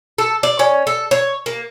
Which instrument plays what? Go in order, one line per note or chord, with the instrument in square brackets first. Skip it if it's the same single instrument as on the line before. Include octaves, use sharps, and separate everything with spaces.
[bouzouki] A4
D5
C#4
A4
C#5
A#3